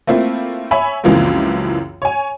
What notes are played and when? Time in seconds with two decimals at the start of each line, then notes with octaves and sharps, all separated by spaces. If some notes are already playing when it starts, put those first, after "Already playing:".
0.07 A3 A#3 C4 E4 F4
0.71 C#5 E5 G#5 B5
1.04 C#2 F#2 E3 F3 A#3 C4
2.02 C#5 G#5